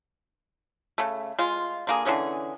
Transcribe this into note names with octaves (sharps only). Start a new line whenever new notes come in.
C#3 A3
G#3 F4
D3 A#3 G#4
D3 E3 C#4 G#4